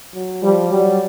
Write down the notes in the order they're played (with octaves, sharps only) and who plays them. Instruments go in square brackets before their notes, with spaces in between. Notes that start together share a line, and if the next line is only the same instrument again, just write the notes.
[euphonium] F#3
[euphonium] F3 [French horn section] G3
[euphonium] F#3 [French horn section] G3